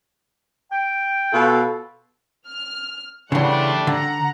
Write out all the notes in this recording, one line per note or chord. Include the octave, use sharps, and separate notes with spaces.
G5
B2 F4 A4
F6
C#3 E3 G3 A3 D4 F#5 C6
D3 F#5 A#5